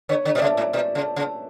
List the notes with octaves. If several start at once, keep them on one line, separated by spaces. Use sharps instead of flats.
D3 C#5
D3
B2 D5
C#3 E5
A2
B2 D5
C#3
C#3